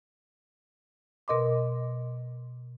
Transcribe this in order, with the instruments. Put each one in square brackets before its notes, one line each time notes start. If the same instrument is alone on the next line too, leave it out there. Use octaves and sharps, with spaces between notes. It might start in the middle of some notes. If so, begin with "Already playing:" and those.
[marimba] B2 A#4 D#5 C6 D6